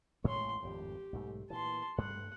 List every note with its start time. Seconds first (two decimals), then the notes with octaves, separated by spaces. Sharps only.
0.24 A1 A2 G#3 C#5 C6
0.62 G#1 F2 A2 G4
1.13 B1 G#2 A3
1.50 A#2 E3 A5 C6
1.98 G2 G3 A3 F#5